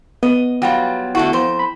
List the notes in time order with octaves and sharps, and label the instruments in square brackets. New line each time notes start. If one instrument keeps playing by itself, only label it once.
[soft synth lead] B3 [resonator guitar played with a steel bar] D#5
[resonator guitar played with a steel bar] F#3 G3 F4 [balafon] F#5 G5
[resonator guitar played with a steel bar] D3 A3 F#4 [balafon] E4
[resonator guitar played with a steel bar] F2 C5
[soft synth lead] B5